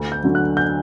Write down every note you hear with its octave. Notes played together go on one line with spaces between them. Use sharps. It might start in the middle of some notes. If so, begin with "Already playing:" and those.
Already playing: D2
G6
D3 F#3
F#6
G6